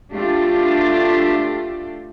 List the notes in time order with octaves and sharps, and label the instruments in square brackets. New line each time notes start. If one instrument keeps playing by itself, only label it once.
[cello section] A3 D4 F4 G4